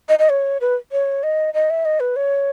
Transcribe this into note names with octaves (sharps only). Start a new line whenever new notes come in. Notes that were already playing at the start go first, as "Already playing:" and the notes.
D#5
D#5
C#5
B4
C#5
D#5
D#5
E5
D#5
B4
C#5